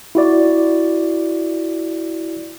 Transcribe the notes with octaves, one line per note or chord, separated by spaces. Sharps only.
E4 F#4 D5